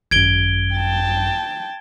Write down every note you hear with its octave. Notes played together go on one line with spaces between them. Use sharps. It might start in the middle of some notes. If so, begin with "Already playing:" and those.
G#1 F#2 G#6 D7 G7
G5 A5